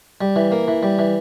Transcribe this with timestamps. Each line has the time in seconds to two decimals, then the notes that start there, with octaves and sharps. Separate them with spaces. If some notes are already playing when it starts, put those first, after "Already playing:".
0.21 G3
0.36 E3
0.52 A#3
0.68 E3
0.83 G3
0.99 E3